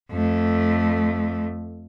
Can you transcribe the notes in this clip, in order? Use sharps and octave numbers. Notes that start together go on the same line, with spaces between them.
F2 A3